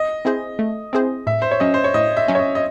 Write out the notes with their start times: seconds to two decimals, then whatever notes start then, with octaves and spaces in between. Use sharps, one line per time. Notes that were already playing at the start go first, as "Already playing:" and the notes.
Already playing: D#5
0.25 C4 E4 G#4 C5
0.59 A3
0.93 C4 E4 G#4 C5
1.27 A2 E5
1.42 C5
1.51 C#5
1.60 F#3 C#4 D#5
1.74 C5
1.84 C#5
1.94 A2 D#5
2.17 E5
2.28 F#3 C#4
2.35 C#5
2.39 D#5
2.55 D#5